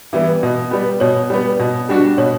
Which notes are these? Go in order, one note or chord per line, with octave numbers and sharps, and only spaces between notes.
E3 G3 B3
B2
G3 B3
B2 C#5
G3 B3
B2
G3 D4 F#4
B2 C#5